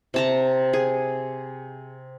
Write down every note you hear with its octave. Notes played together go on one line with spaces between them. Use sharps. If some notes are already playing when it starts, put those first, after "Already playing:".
C3 A5 A#5
G#4